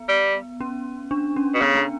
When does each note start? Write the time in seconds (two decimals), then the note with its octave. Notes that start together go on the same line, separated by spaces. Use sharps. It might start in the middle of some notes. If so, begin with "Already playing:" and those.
Already playing: B3
0.09 G3
0.61 C#4
1.11 D4
1.36 C#4
1.54 B2
1.62 C#3 B3
1.75 B3